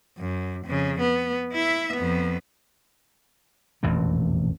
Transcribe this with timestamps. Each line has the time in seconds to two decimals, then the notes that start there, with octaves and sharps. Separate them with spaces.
0.18 F#2
0.65 F2 C#3
1.00 B3
1.52 E4 E5
1.93 F2 B3
3.83 E1 A1 F2 A#2